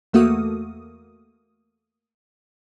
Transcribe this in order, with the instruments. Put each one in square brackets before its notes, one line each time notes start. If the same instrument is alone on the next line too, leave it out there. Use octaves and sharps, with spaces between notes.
[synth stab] E2 A3 A#3 F#4 D#6